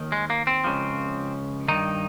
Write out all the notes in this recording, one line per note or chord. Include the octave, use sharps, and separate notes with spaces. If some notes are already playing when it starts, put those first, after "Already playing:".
Already playing: D#2 D#3
G#3
A#3
C4
C#2 C#3 F3
G2 D#3 D#4